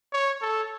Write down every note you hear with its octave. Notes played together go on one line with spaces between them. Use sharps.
C#5
A4